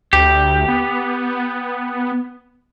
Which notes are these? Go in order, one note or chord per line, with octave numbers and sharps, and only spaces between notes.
D2 G4
B3